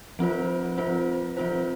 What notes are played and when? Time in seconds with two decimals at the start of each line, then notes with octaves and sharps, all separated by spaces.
0.19 F3 C4 F4 C5
0.78 F3 C4 F4 C5
1.37 F3 C4 F4 C5